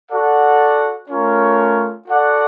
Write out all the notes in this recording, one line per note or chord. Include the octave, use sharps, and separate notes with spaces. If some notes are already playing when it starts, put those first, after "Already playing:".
F#4 A4 D5 F#5
A3 C#4 F4 A#4 C#5
F#4 A4 D5 F#5